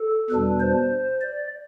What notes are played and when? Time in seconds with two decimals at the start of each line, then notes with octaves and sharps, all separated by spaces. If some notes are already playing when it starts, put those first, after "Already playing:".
Already playing: A4
0.30 E2 B2 G3 D4 B4
0.60 C5
1.21 D5